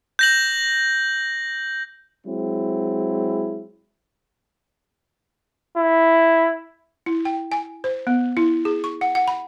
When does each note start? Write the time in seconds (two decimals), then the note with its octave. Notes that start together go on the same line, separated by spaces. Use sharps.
0.19 G6 A#6 F#7
2.26 F#3 G#3 C4 E4
5.77 E4
7.06 E4
7.25 G5
7.52 G#5
7.84 C5
8.07 B3
8.37 E4
8.65 G#4
8.84 C#6
9.01 F#5
9.15 F#5
9.28 B5